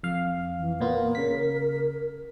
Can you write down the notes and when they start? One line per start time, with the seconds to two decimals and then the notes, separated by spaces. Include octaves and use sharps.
0.03 F2 F5
0.59 E3
0.81 A#2 B3 F4 A#4
1.15 C#3 B6